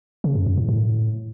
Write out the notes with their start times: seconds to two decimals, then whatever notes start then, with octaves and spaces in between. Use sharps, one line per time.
0.24 C#3
0.35 F#2
0.46 F#2
0.57 A2
0.69 A2